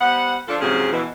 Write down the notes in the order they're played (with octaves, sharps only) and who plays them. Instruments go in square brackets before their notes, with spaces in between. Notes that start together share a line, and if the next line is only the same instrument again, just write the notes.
[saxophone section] G3 B3 C5 F#5
F3 D4 A4
G#2 C3 F3 F#3 C#4 G#4
B2 E3